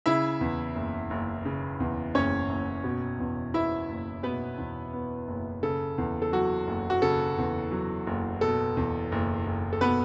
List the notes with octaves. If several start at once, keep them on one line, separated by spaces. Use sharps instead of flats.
C#3 E4 E5
E2
F#1
F#1
C#3
E2
F#1 C#4 C#5
F#1
B2
E2
B3 E4 E5
F#1
B2 B3 B4
E2
B3
F#1
C#3 A4
E2
A4
F#3 F#4
F#1
F#4
C#3 A4
E2
F#3
F#1
B2 A4
E2
F#1
F#1
A4
B2 B3 B4